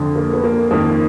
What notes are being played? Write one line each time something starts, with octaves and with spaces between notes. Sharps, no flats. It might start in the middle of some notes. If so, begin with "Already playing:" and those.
Already playing: F2 D3
A#3
B3
A#3
F2 D#3 A#3